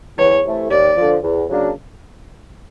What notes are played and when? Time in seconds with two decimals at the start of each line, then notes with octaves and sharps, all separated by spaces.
0.18 E2 C#5
0.44 C3 E3 A3
0.70 D#2 D5
0.97 D3 F3
1.23 E2
1.49 C#3 F#3 A#3 D4